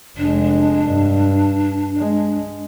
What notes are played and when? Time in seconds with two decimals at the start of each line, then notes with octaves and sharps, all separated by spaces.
0.18 F1 G#3 D4
0.87 G2
1.98 G#3